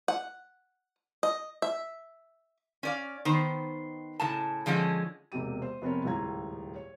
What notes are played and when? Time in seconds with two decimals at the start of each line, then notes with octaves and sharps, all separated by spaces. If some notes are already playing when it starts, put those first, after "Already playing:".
0.08 F#5
1.23 D#5
1.62 E5
2.83 C#4 D5 F5
3.25 D#3 B3 C5
4.20 A2 C#3 A5
4.66 D3 F3 G#3 C4 C#4
5.32 E1 C3 A#3 G4 D#7
5.62 C5
5.82 F1 B3 C4 A#4 C#5
6.04 D#1 C#2 A2 F4 A#5 G#6
6.75 C#5